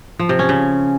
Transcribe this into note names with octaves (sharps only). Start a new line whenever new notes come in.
F3
C3
C#4
C#3